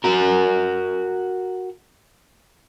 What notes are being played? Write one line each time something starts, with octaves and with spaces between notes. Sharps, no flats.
F#4 A#4